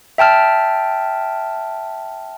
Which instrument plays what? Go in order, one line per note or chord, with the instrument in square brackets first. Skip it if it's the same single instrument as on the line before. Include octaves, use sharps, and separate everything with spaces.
[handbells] E5 G5 A5 F6